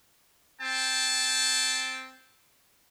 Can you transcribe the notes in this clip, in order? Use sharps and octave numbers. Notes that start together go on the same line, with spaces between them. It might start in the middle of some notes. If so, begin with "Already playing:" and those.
C4 G5 A5